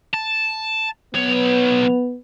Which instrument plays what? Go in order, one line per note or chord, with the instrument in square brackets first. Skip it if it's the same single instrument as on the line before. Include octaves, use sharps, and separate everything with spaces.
[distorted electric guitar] A5
[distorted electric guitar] B1 C#5 [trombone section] B3